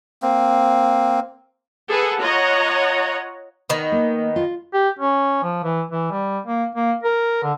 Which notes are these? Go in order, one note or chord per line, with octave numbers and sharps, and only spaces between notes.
A#3 C4
G#4 A4 B4 F#5
F4 C#5 D#5 F#5 A#5
D#3 B3
A#3
F4
G4
C#4
F3
E3
E3
G3
A#3
A#3
A#4
D3